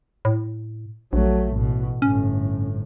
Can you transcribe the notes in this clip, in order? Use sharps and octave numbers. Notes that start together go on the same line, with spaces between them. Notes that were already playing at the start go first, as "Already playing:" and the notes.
A2
A#1 F#3 A3
A1 B2
G1 A2 C#4